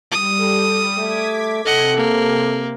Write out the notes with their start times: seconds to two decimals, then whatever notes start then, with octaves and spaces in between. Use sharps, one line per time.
0.12 G3 D#6
0.40 A4
0.98 A3 D6 G#6 B6
1.65 C3 A4 D#5 F#5
1.96 A#3